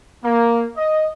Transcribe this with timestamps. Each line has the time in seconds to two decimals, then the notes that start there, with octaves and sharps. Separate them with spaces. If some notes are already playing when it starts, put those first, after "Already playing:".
0.24 A#3
0.77 D#5